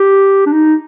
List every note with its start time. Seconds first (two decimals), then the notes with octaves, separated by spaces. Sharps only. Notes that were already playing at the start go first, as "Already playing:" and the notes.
Already playing: G4
0.46 D4
0.52 D#4